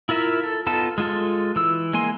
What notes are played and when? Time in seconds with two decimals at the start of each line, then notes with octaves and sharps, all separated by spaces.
0.09 E4 F4 A#4 E5
0.43 A4
0.67 B3 D#4 F4 A4 A5
0.98 G#3 F4 A4
1.56 E3 E6
1.93 G#3 A#3 G#5 C6